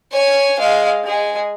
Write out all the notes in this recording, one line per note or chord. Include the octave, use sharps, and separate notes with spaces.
C#5 G#5
G#3 F5
G#3 G#4